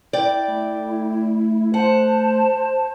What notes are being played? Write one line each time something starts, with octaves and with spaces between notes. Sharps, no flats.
E4 D5 G5
A3
C5 F#5 A5